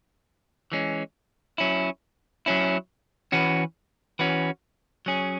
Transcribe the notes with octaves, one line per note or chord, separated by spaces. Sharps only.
E3 G#3 C#4
F#3 C#4 E4
F#3 C#4 E4
E3 C#4 F#4 B4
E3 C#4 F#4 B4
F#3 C#4 G#4